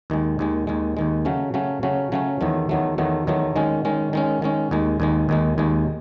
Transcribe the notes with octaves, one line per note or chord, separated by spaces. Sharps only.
D#2 D#3 G#3
D#2 D#3 G#3
D#2 D#3 G#3
D#2 D#3 G#3
C#3 F#3 A3 C#4
C#3 F#3 A3 C#4
C#3 F#3 A3 C#4
C#3 F#3 A3 C#4
E2 D#3 F#3 A3
E2 D#3 F#3 A3
E2 D#3 F#3 A3
E2 D#3 F#3 A3
D#3 G#3 C#4
D#3 G#3 C#4
D#3 G#3 C#4
D#3 G#3 C#4
D#2 D#3 G#3
D#2 D#3 G#3
D#2 D#3 G#3
D#2 D#3 G#3